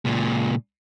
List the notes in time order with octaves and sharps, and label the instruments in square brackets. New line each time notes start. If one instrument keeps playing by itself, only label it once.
[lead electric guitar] C#2 A#2